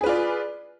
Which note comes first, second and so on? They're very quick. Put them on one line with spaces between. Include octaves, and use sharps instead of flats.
G#4 B4 F4 D5